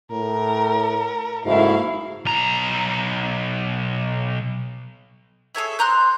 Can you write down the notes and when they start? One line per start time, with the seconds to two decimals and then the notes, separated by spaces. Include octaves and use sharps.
0.11 A2 A#4
1.46 F#1 G#2 A3 A#3 E4 F#4 F5
2.25 B1 A#5
5.55 G#4 A4 C#5 E5
5.79 C5 A#5 C6 F#6